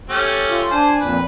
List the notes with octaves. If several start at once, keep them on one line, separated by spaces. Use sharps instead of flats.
A3 C#4 G4
F4
D4 C5 G#5
F2 A#2 B4